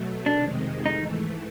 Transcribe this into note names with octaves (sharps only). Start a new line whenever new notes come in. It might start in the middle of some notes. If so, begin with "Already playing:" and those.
Already playing: B2 F#3 A3
F2 C3 D#3 G#3 D4
G#2 E3 A3 D#4